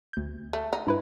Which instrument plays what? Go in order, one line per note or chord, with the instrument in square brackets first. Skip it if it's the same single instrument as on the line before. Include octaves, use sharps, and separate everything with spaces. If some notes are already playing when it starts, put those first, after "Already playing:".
[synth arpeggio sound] D2 G6
[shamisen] A3
D#4
[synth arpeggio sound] G2 E4 B4